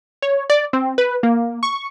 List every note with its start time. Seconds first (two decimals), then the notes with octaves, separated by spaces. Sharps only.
0.22 C#5
0.50 D5
0.73 C4
0.98 B4
1.23 A#3
1.63 C#6